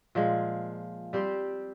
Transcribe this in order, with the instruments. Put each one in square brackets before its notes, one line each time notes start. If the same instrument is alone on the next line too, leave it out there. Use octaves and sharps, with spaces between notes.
[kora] A#2 F3 G#3
G3 C4 G4 C5